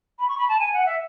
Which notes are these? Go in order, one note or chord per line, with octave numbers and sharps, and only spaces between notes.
B5
C#6
B5
A5
G#5
F#5
E5